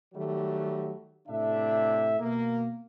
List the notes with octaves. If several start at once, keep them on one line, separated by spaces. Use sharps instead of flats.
D#3 F#3 G3 A3 G4
A2 C3 D4 E5
B2 A#3